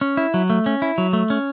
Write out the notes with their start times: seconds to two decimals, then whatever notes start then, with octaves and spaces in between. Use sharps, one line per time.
0.01 C#4
0.17 E4
0.34 F#3
0.50 A3
0.66 C#4
0.82 E4
0.98 F#3
1.13 A3
1.30 C#4